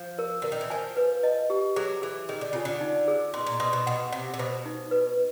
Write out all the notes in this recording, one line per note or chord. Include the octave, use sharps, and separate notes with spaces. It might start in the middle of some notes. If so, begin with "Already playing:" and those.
Already playing: F3
A#4
D3 A#4
D#3
E3
F3 G#5
B4
D#5
G4
F#3 G#4
E3 G#4
D#3 G#4
D3
C#3 F4
D3
D#4
G#4
B2 C6
A#2
B2 C6
B2
B2 F#5
C3 F#5
C3
B2 C5
D#4
B4